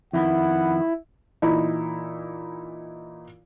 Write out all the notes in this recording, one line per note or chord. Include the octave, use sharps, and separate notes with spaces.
F2 D#3 B3 E4 F#5
A#2 E3 D#4 E4